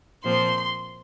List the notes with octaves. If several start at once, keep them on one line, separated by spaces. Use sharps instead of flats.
A#2 F3 C4 C6